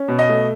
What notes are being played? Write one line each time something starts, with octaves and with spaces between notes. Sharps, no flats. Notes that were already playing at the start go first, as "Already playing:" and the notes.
Already playing: C#4
B2
D#5
A3